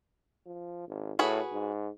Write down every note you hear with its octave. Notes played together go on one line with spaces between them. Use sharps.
F3
G#1
A2 F#4 G#4 B4
G#2